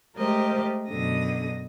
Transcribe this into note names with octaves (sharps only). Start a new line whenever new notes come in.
G#3 A3 G4 A#4 C5 D#5
F#2 B2 D3 D#6 A#6